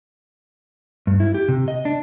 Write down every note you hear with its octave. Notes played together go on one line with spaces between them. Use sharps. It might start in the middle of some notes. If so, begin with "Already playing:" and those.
G2
E4
G4
C3
D#5
D4